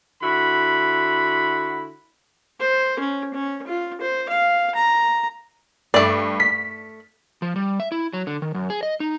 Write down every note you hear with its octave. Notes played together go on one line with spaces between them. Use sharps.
D3 E4 F#4 B5
C5
C#4
C#4
F4
C5
F5
A#5
G2 A3 D5
B6
F3
G3
E5
E4
F#3
D3
D#3
F#2
G#4
D#5
D#4